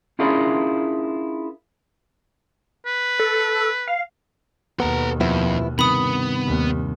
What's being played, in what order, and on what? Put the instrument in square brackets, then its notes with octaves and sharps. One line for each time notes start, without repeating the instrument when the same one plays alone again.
[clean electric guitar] C#4 D4 E4 F4 G#4 A#4
[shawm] B4
[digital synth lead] A4
F5
[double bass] D#2 B2 [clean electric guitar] B3 [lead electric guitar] A4 A#5
[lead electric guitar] F2 [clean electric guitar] F3 B3 E4
[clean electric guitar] G2 C3 D#3 [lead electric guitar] B3 [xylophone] B5 D#6
[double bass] D#2